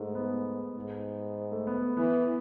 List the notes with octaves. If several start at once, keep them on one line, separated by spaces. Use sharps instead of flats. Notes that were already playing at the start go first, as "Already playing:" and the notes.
Already playing: G#2 G#3 A3
B3
G#2
A3
B3
E3 B3